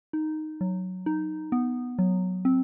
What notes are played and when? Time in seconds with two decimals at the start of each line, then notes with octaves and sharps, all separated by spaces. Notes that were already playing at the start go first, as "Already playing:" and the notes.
0.13 D#4
0.61 F#3
1.06 D#4
1.52 B3
1.99 F#3
2.45 C4